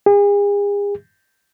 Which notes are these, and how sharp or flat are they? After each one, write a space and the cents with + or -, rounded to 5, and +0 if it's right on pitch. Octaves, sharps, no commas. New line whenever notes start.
G#4 -40